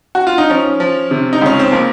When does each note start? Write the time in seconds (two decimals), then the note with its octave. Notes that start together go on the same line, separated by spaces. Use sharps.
0.15 F#4
0.27 F4
0.38 D#4
0.50 F3 C#4
0.80 F3
1.11 C3
1.33 D#4
1.42 C#2 C#4
1.59 C4
1.72 F3 A#3